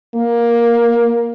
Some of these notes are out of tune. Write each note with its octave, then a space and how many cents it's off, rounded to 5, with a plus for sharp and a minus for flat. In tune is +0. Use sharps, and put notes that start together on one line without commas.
A#3 +10